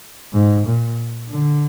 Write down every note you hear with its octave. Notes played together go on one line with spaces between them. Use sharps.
G#2
A#2
D3